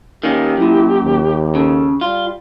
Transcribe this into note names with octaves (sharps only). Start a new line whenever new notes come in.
D#3 A#3 C#4 G4
F#2 A#2 E4
D#2
C#3 A4
G3 F4